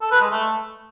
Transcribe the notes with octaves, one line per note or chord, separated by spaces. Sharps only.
A4
B4
G#3
A3